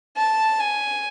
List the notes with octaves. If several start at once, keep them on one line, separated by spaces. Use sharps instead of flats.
A5
G#5